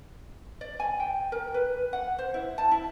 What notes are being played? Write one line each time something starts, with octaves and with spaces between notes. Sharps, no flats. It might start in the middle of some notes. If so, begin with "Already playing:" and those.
D5
G#5
G5
A#4
B4
F#5
C5
E4
A5
E4